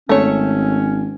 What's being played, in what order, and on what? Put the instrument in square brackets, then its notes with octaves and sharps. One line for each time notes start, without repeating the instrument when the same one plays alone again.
[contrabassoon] G#1 [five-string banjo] A3 C#5 [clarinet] C#4